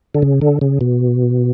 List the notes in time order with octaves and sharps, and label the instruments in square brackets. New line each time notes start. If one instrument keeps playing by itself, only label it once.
[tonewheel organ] D3
C#3
D3
C#3
B2